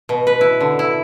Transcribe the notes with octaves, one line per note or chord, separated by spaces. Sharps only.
B2
B4
E4
D3
E4